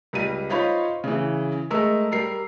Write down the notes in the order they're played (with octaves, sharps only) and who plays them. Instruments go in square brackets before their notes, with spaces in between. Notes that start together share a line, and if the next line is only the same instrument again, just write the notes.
[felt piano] C#2 G3 D#7
D#4 F4 C5 C#5 F5 B5
C#3 E3
G#3 A3 A#4 E6
G3 A#4 C7